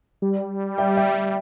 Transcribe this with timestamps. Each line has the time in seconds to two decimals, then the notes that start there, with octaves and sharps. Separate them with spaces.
0.22 G3
0.78 E5 G5
0.97 E5 G5